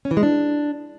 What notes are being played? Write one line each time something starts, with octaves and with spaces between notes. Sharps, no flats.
C#4
E3
G#3
D4